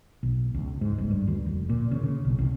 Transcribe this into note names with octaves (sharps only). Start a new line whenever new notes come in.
B1
C#2
G#2
G1
G2
D2
F1
A#2
C#3
C#3
B1
C2